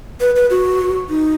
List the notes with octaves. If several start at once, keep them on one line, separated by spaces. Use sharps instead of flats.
B4
B4
F#4
D#4